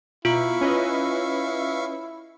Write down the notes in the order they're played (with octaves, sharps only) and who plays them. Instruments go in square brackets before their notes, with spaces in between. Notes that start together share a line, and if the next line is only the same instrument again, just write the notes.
[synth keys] B2 [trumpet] E4 [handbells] F4 [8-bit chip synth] E5 F5 C#6
[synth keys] C#4 B4 D#5